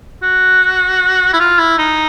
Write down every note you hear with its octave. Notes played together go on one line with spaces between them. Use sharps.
F#4
E4
F4
E4
D#4